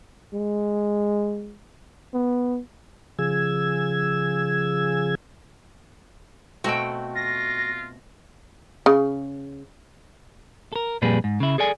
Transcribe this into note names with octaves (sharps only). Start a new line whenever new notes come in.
G#3
B3
C#3 F3 G#4 E6 G#6
B2 A3 C4 F#4 G5
F4 A#6
C#3
A4 A#4
F2 A#2 G3 G#4 B4
G#2
C#3 E4
G#4 A4 D5 G#5